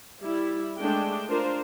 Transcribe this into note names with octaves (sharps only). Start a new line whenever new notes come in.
G3 E4
G#3 A3 D4 G5
D4 F4 A#4 C5